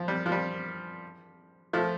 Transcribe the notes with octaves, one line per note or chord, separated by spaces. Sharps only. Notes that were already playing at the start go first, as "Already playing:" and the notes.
Already playing: F3
G3
F3
G3
F3 A3